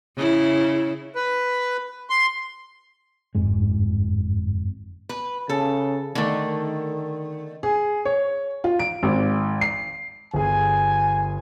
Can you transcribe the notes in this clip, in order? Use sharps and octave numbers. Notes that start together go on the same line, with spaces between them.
C#3 E4
B4
C6
G1 F2 G#2 G#3
B4
C#3 A4
D3 D#3 A3
G#4
C#5
F4
D7
G#1
C7
G1 G#4 G#5